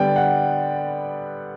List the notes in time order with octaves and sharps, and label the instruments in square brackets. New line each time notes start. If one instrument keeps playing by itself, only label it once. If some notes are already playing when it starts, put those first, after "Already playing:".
Already playing: [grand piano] D3 G3 B3 D5 G5
F#5